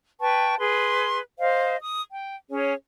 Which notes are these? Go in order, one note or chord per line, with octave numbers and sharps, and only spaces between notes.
B4 G5 A5 C#6
G#4 B4 C6
C5 D#5 F5
D#6
G5
C#4 G#4 C#5